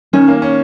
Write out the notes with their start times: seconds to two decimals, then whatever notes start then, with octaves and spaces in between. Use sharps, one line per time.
0.13 D#3 C#4
0.28 A#3
0.42 C#4